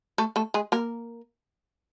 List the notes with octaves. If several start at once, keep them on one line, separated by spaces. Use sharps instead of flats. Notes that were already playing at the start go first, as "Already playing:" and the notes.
A3 A4
A3 A4
G#3 G#4
A#3 A#4